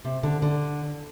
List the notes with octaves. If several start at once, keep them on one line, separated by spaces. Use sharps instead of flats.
C3
D3
D3